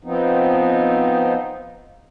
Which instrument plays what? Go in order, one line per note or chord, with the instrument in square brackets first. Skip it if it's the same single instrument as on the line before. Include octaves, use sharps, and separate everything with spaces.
[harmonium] F3 B3 C4 D#4